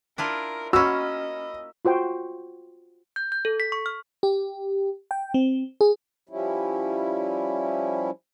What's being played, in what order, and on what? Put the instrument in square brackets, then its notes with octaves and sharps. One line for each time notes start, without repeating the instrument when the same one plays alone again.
[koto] D4 E4 F4 [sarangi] A#4
[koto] A#3 C#4 [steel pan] F#4 [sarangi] D#5 [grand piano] B5 E6
[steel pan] F4 F#4 C5 G5
[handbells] G6
G6
A4
B6
C#6
F6
[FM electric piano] G4
G5
C4
G#4
[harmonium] F3 G3 C#4 E4